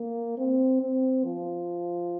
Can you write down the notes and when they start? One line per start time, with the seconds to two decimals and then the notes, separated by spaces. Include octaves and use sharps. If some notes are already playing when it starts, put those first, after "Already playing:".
Already playing: A#3
0.38 C4
0.81 C4
1.24 F3